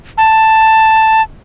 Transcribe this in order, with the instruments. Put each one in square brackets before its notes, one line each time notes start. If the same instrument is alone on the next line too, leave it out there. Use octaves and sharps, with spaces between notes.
[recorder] A5